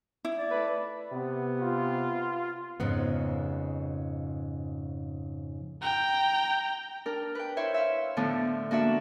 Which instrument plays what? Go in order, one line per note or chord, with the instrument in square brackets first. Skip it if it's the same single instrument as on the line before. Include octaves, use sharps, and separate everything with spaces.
[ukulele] E4
[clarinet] D5
[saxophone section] A3 B4
[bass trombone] C3 [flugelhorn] B3
[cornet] F4
[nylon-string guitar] F2 G#2 C#3 B3
[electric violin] G5 A#5
[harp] D4 A#4
B4 G5
E4 C5 C#5 E5
E5 F5
A2 D3 F3 B3 D4
A#3 D4 F#4 E5